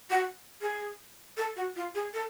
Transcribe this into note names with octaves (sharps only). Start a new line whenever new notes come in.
F#4
G#4
A4
F#4
F4
G#4
A4